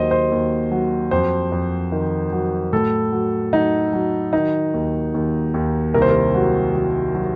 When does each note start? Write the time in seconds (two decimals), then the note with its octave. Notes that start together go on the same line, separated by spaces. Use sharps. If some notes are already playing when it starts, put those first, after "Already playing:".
Already playing: D#2 F#3 C5 D#5
0.11 C5
0.32 D#2
0.71 F#3
1.11 F2 C5
1.52 F2
1.92 D#3
2.32 F#3
2.73 A2 A4
3.12 F#3
3.53 F#3 D#4
3.93 F#3
4.33 D#3 D#4
4.74 D#2
5.14 D#2
5.54 D#2
5.94 C2 A#4
6.02 C5
6.10 A#4
6.34 F#3 F#4
6.75 F#3
7.15 F#3